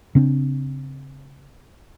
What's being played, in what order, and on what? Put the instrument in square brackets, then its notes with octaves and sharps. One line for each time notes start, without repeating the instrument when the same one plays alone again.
[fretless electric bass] C#3 C4 D4